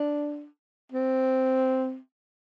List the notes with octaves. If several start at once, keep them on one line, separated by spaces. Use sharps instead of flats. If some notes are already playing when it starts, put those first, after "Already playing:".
Already playing: D4
C4